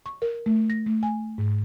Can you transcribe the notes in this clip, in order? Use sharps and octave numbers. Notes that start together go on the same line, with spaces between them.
C#6
A#4
A3
A#6
A3
G#5
G#2